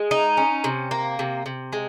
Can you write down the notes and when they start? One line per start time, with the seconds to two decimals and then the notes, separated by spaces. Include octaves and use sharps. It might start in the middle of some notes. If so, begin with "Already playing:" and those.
Already playing: G#3
0.11 D#4
0.37 C#4
0.64 C3
0.91 A#3
1.19 C3
1.46 C3
1.73 G#3